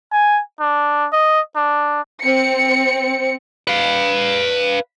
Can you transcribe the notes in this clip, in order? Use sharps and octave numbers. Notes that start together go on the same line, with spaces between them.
G#5
D4
D#5
D4
C4 C#7
B4 F5